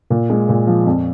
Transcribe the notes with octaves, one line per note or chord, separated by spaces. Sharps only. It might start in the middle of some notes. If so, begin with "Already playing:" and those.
A#2
G#3
A#2
F3
F2